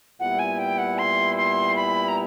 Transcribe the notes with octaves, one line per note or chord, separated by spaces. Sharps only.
A#2 G3 B3 E4 F#5
G#5
G5
F#5
C6
C6
B5
A#5